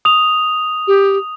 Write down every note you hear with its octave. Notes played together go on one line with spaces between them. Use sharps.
D#6 F7
G4